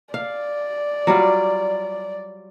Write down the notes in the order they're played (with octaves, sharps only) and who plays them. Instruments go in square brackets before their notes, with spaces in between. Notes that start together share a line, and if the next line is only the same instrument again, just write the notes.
[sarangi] D5 [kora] F5
[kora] F#3 G3 F4